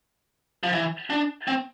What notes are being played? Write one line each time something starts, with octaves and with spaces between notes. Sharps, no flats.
F3
E3
D4
C4